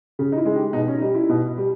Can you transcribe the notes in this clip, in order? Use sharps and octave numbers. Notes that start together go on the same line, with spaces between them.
C#3
D#4
E4
G#3
G4
B2 D#4
C#4
G3 D#4
E4
B2
G3